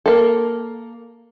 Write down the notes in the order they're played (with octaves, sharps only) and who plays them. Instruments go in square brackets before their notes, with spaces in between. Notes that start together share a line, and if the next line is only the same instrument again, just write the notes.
[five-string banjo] A#3 A4